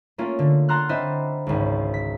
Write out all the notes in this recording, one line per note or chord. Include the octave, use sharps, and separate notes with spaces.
A3 A#3 C#4 F4
D3
F#5 A5 A#5 C6 F6 F#6
C4 D4 E4 C5 D#5 E5
G#1 C#2
B6